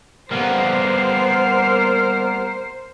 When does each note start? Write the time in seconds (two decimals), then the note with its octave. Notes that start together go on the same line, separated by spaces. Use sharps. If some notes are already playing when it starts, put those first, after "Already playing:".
0.31 G3 A#3 B3 A#4 C5